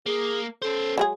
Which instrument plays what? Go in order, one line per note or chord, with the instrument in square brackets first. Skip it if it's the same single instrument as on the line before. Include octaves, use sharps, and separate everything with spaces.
[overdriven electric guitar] A#3 [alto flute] G#4
[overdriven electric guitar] C#4 C5 [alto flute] A4
[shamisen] F#3 G#3 G#4